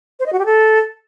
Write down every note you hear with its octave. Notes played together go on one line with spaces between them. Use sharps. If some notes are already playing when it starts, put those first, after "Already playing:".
C5
D#5
F#4
G4
A4